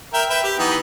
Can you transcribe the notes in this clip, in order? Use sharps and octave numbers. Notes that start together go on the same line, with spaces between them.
A#4 E5 G5
B4 E5 G5
G4
E3 B3 D#4